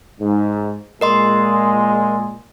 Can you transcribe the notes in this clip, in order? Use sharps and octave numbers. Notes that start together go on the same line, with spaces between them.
G#2
A#2 G#3 A#4 D#5 C6